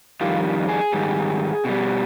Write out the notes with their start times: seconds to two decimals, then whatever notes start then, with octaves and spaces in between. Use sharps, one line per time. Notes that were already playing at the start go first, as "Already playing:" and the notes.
0.21 F2 D#3 G3 F4
0.69 G#4
0.93 G#2 D#3 G3
1.65 B2 G3